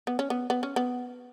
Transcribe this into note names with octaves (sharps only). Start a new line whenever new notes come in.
B3
C#4
B3
B3
C#4
B3